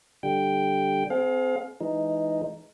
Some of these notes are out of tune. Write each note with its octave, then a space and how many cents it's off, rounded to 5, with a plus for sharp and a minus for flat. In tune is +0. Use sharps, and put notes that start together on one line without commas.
D3 +0 G3 +0 G5 +0
C4 -25 G#4 +40 F5 +25
E3 +5 G#3 +25 D#4 +0